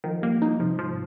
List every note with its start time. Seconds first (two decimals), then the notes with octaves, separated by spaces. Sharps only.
0.04 D#3 F3
0.22 G3 A#3
0.42 D#4
0.59 C3 F3
0.78 G#2 F3